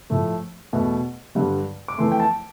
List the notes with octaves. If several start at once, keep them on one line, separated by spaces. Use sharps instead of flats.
A2 F3 A3
E2 B2 A3
G2 D3 G3
D6
F2 E3 A3 C6
G5
A5